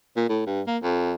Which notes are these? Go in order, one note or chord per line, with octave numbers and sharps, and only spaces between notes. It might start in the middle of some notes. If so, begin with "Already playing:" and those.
A#2
A2
G2
A#3
F2